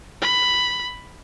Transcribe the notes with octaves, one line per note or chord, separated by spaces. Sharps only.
B5